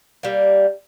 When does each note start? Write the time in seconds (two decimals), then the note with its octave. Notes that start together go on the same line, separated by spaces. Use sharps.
0.23 G3 A#3